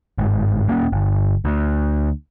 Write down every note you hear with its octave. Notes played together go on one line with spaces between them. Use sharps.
G1 G#2
D#1 A#3 C#4
G1
D2